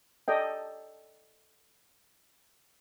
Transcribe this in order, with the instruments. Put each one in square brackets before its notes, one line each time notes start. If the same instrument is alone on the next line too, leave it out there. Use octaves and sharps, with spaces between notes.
[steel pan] A4 D5 D#5 G5